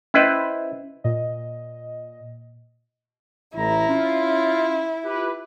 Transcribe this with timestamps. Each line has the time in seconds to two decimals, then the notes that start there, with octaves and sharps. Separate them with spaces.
0.14 C#4 E4 B4 C5 D#5 E5
1.04 A#2 D#5
3.55 A1 E4 A#5
3.89 C#4 F4
5.04 F4 G4 B4